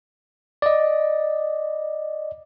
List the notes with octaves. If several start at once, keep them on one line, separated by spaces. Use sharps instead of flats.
D5 D#5